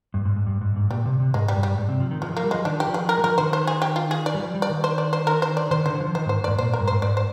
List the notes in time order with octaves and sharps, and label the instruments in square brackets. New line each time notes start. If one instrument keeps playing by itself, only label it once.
[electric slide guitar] G2
G#2
G#2
G2
G#2
G#2
[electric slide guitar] A#2 [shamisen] G3
[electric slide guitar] C3
C3
[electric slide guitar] G#2 [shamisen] G#3
[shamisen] G3
[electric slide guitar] G2
[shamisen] G3
[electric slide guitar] G#2
C3
F3
D#3
[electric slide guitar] F3 [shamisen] G#3
[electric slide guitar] F3 [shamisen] A#3
[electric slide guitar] G3
[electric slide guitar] F3 [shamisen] G#3
[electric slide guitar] D#3 [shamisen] D4
[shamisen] G4
[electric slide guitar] F3
[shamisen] G#4
A#4
[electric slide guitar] G3
[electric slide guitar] F3 [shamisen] A#4
[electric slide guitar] D#3 [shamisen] C5
[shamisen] C5
G#4
G4
F4
G#4
D5
[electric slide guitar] G3
F3
G3
[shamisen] D5
[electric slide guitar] D#3
[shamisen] C5
D5
C5
A#4
C5
D5
[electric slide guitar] D#3 [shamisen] C5
[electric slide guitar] D3 [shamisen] C5
[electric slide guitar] D#3
F3
[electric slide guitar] D#3 [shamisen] C5
[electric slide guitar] G#2 [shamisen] C5
[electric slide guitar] G#2 [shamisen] D5
[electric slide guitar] A#2 [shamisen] C5
[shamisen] A#4
[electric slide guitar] G2
[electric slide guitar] G#2 [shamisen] C5
[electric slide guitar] G#2 [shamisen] D5
[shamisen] C5